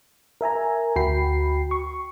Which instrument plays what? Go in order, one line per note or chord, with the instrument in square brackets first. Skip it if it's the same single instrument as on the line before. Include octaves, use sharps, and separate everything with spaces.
[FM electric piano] A#4 E5 G#5 A#5
D2 F#4 G5 B5 C7
C#6